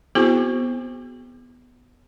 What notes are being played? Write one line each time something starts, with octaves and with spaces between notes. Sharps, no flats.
B3 C4 E4 F#4 G#4 C5